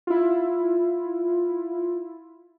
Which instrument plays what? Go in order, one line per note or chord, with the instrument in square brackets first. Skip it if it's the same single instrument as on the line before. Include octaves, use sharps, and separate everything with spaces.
[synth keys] E4 F4